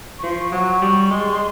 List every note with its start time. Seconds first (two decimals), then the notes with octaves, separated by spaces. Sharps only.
0.18 C#6
0.22 F3 C6
0.38 C#6
0.52 F#3 C#6
0.82 G3
1.10 G#3 C6
1.29 G#3